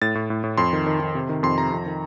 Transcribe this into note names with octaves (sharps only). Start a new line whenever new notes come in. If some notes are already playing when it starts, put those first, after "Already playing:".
A2 A6
A2
A2
A2
F2 C6
D#3
D#3
D#3
C3
D#3
F2 C6
C3 A#5
F2
D#3